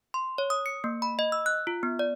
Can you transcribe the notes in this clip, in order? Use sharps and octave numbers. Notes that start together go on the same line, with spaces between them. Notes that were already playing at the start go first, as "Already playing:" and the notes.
C6
C#5
D#6
C#7
A#3
B5
D#5
E6
F#6
F4
B3
D5